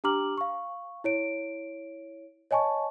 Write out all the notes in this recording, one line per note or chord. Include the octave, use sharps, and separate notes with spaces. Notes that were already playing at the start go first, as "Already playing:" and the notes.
D4 G4 A#5 D6 F6 F#7
F5 C#6
E4 C#5 D7
C#5 D#5 G#5 A5 C#6